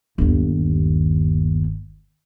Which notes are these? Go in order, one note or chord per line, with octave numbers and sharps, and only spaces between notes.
G1 D#2